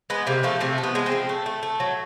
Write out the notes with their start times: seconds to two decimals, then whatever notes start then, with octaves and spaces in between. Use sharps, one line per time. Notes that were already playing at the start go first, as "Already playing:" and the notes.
0.10 G#3 B3
0.27 C3 A#3
0.43 F3 A3
0.61 C3 A3
0.78 F3
0.83 B3
0.95 G#3
1.06 C4
1.12 F3
1.29 A3
1.46 A3
1.63 A3
1.80 F#3